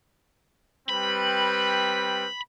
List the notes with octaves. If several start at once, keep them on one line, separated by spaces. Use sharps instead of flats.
G3 C4 B4 B5